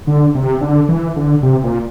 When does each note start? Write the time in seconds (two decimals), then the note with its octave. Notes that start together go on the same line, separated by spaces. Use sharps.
0.07 D3
0.35 C3
0.61 D3
0.89 E3
1.16 D3
1.43 C3
1.64 A#2